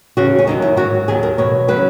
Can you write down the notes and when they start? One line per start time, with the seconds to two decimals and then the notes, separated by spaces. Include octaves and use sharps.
0.17 D#2 C#3 E3 F#4
0.39 C#4
0.47 E2 D#3 F#3 D#4
0.62 E4
0.77 G#2 F#3 F#4
1.08 D#2 D#3 F#3 G#4
1.23 A#4
1.38 E2 B2 F#3 C#5
1.68 C#3 F#3 B4